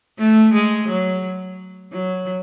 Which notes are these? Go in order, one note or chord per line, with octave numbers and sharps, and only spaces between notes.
A3
G#3
F#3
F#3